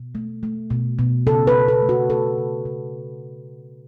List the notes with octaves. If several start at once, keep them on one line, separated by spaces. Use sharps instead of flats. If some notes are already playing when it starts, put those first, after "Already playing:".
Already playing: B2
A3
A3
B2
B2
C#3 A4
B4
C#3
A4
A3
F#4
A3 A4
C#3
C#3